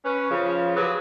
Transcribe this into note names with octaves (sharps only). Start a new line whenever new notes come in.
C#4 B4
C#3 F3
F#3 G4 G#4 B4